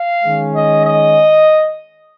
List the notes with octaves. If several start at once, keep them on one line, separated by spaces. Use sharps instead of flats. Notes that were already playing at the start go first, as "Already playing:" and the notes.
Already playing: F5
D#3 G#3 C#4
D#5
D#5